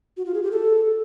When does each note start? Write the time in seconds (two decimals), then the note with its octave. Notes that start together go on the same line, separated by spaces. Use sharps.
0.17 F#4
0.26 F4
0.34 G#4
0.43 G4
0.51 A4